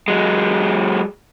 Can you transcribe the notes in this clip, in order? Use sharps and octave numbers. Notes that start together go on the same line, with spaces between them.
F#3 G#3